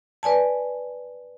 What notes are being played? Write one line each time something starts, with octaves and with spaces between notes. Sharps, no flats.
B4 D5 G#5 A5